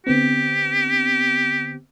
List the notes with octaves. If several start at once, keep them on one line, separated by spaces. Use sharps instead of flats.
D3 B3 C4 G4